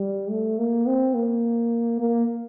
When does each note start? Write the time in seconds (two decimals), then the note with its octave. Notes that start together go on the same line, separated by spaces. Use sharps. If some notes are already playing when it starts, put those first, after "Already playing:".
Already playing: G3
0.30 A3
0.59 A#3
0.86 C4
1.14 A#3
2.00 A#3